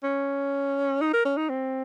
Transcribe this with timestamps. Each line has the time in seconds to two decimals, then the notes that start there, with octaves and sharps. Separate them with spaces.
0.04 C#4
1.01 D#4
1.14 A#4
1.25 C#4
1.37 D#4
1.50 C4